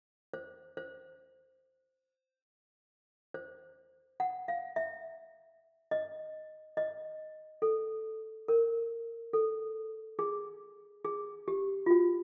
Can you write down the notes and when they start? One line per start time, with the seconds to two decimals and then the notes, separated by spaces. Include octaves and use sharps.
0.34 C5
0.77 C5
3.34 C5
4.20 F#5
4.48 F5
4.76 E5
5.91 D#5
6.77 D#5
7.62 A4
8.48 A#4
9.33 A4
10.19 G#4
11.05 G#4
11.48 G4
11.86 F4
11.91 F#4